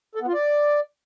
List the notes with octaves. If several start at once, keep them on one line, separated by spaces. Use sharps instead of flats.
A4
B3
F4
D5